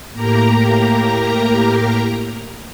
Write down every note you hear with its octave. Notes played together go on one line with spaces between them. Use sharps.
A2 A#3 G4 A#4 A#5